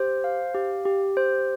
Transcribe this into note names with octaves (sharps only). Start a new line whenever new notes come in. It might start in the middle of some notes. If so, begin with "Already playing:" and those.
Already playing: G4 C5
F5
G4
G4
C5